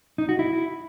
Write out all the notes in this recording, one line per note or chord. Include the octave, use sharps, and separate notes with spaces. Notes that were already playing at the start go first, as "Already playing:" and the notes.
D#4
F#4
E4